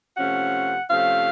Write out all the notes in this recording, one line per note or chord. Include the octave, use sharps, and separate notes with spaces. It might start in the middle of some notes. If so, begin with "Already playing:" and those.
C3 F3 A3 C#4 F#5
C3 F3 A3 C#4 F5